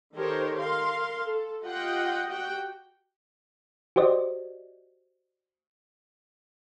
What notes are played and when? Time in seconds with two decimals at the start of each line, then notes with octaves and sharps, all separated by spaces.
0.14 D#3 G4 A4 A#4 C5 C#5
0.56 A#4 F5 C6
1.23 A4
1.63 F4 G4 D#5 F#5 G5
2.29 F#4 G4 F#5 G5
3.96 F#4 G4 C5 D5 D#5